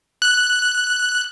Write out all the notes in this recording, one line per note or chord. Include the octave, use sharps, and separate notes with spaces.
F#6